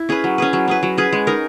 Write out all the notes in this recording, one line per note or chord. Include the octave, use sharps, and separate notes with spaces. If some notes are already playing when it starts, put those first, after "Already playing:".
Already playing: E4
C#4 G#4 B4
F#3
C#4 G#4 B4
F#3
C#4 G#4 B4
F#3
C#4 G#4 B4
G#3
D#4 A#4